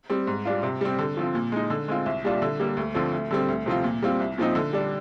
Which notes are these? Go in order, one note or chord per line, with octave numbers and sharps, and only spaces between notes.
G3 C4
G#2
G3 D4 F4
C3
G3 C4
D3
F3 C4 F4
A#2
G#3 D#4
D3
G#3 C4 F4
C2
A#2 G3 D4 F4
D3
G3 A#3
D2
D3 F3 C4
D2
D3 G3 C4
D2
C3 F3 C4 F4
A#2
G3 C4 F4
C2
A#2 F3 C4 D#4
D3
G3 D4